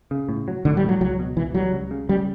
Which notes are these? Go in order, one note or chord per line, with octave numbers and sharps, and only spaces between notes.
C#3
A2
F#3
A2 D3
G3
A2
F#3
C#2 F#3
B2
C#2 E3
F#3 G3
C#2
C#3
C#3 G3